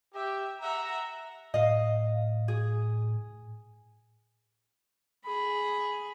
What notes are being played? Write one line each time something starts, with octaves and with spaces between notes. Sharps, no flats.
G4 E5
E5 F#5 A#5
A2 D#5 F5
G#4
G#4 B5